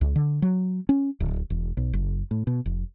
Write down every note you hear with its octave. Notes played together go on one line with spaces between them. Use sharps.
C#2
D3
F#3
C#4
D1
E1
B1
F#1
A2
B2
F1